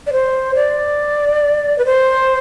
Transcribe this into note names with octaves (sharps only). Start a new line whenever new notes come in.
D5
C5
D5
B4
C5